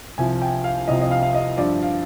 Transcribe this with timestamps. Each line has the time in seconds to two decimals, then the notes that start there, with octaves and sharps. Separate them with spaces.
0.18 C2 C3 F3 G#5
0.42 G5
0.64 F5
0.88 C2 C3 F3 D#5
1.01 D#5
1.11 F5
1.23 F5
1.35 D#5
1.57 G2 F3 D5
1.82 F5